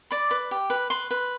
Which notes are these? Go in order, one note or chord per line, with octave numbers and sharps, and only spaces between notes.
D5 B5
B4
G4
B4
B4 C6
B4